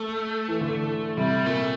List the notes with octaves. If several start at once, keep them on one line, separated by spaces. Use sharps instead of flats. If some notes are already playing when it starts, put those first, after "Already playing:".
Already playing: A3
E3
D3
C3 G3
A#2 A3